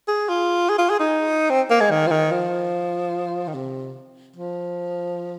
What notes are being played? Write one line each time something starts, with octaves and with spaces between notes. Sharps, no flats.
G#4
F4
G#4
F4
G#4
D#4
C4
A#3
G#3
D#3
F3
D#3
F3
D#3
C3
F3